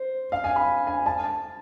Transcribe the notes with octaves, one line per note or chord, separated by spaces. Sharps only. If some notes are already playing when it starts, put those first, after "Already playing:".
Already playing: C5
F5
G#5
B5
G#5
A5